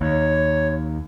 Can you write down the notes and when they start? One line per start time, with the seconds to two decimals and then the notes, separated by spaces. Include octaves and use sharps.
0.01 D#2 C#5